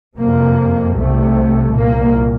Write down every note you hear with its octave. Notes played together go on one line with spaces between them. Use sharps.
F2 C3 A#3
C2 C3 A3
C2 A#2 A#3